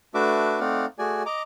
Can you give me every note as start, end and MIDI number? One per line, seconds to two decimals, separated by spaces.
0.14 0.59 57
0.14 0.59 62
0.14 0.59 66
0.14 0.59 71
0.14 0.59 76
0.14 0.59 86
0.60 0.86 57
0.60 0.86 60
0.60 0.86 63
0.60 0.86 74
0.60 0.86 77
0.60 0.86 78
0.99 1.23 57
0.99 1.23 66
0.99 1.23 68
0.99 1.23 74
0.99 1.23 80
1.26 1.42 75
1.26 1.42 82
1.26 1.42 86